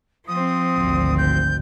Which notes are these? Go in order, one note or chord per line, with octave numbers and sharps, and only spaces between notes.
F3 C4 D#6
G#1 D2
G6